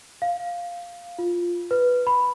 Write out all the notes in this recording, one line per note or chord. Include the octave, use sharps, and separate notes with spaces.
F5
F4
B4
B5